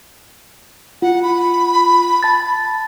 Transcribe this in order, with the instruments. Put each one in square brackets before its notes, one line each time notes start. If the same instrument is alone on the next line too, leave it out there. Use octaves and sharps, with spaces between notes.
[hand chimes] F4 [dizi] F#5
[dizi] B5
[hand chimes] A5 A6